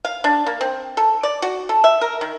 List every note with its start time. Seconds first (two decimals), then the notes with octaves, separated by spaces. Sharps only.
0.05 F5
0.24 D4
0.46 A#3
0.61 C4
0.97 A4
1.23 D5
1.42 F#4
1.69 A4
1.84 E5
2.01 A#4
2.21 D#3